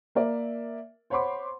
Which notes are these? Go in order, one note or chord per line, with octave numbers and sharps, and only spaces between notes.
A#3 A#4 D5 E5
C5 C#5 F#5 B5 C6 D6